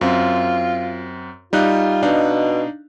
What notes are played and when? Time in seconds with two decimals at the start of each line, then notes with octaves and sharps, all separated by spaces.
0.01 F#2 C4 F4
1.53 G3 D#4 F4 F#6
2.03 B2 D4 D#4 F5